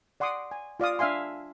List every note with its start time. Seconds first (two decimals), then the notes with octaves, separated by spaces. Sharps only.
0.20 D5 F#5 C6 D6 D#6
0.51 G#5
0.80 F4 D5 F5 D#6
0.99 D4 E5 F5 G#5 C6